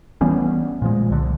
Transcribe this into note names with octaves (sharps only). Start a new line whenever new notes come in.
E3 G3 B3 C#4
A#2 F3 G#3
C2 D3